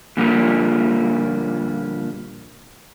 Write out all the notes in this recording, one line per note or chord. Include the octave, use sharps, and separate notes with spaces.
A#2 D3 F3 G3 A#3